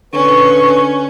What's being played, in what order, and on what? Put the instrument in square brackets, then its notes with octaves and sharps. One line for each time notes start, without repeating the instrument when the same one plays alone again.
[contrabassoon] D3 [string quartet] C#4 [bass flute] B4 [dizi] C#6